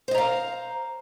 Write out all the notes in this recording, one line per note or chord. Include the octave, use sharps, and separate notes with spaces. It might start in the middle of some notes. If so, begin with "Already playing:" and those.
C5 D#5 F5 A#5